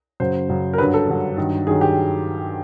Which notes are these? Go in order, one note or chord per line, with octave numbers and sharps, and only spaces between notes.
F#2 C#3 F#3 C5
F#2 C#3 F#3
A#4
G2 D3 F#3 B4
A4
G2 D3 F#3
G2 D#3 F#3
G2 D#3 F#3 G#4
G4